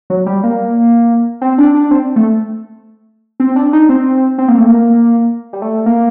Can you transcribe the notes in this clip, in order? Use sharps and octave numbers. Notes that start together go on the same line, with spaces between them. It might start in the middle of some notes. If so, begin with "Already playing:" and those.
F#3
G3
A#3
C4
D4
D4
C4
A3
C4
D4
D#4
C4
C4
A#3
A3
A#3
G3
A3
A#3